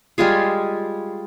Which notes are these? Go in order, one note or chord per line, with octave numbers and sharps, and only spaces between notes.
G3 G#3 F4 G#4